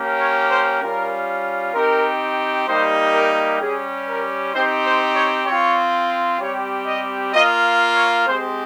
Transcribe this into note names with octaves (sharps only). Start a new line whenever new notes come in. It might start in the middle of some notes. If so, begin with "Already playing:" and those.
Already playing: A#3 C#4 G4
C#5
C5
G3 C#4 F4 A#4
C4 D#4 G4 A#4
G3 A#3 D#4 G4 C5
A#4
G3 C#4 G4 G#4
A#4
C4 D#4 G4 C5
C5
C#5
C4 F4 C#5
G3 C4 G4 C#5
D#5
A#3 F4 D#5
C#5
G#3 C4 G4 C5